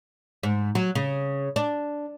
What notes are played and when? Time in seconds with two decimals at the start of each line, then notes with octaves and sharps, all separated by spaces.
0.43 G#2
0.75 F#3
0.95 C#3
1.56 D4